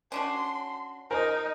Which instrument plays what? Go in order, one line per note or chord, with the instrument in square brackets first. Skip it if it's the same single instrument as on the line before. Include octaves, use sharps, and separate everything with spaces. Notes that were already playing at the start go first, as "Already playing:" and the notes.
[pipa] C#4 D4 F#4 [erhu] C6
[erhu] D#4 [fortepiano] A#4 C5